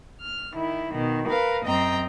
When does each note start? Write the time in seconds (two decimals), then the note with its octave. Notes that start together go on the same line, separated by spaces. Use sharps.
0.21 F6
0.53 D#3 E4
0.90 B2 D#3
1.26 A#4 B4 F5
1.64 F#2 C4 D#5 G5 A#5